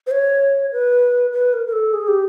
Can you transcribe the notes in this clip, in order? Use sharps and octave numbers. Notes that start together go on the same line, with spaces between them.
C5
C#5
B4
B4
A#4
A#4
A4
G#4
G4